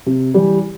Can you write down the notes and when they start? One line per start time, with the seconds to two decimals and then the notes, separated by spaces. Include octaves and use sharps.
0.06 C3
0.34 E3 G3